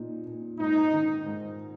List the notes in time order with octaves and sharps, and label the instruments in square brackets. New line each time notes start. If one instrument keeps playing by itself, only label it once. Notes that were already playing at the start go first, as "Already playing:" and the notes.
Already playing: [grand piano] A#2 D#4
A#2
[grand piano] G#2 [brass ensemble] D#4
[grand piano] D#3
G#2